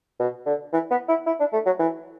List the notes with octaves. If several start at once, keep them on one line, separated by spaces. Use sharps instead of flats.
B2
D3
E3
B3
E4
E4
D4
A3
F#3
E3